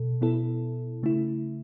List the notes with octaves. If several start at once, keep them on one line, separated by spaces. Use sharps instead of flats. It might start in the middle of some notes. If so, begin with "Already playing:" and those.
Already playing: B2 A4
B2 B3 E4 A4
C#3 A3 E4